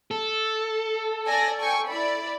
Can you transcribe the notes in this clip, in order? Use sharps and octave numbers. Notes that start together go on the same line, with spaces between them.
A4
D5 G#5 A#6
G5 G#5 C#6
E4 D5 B5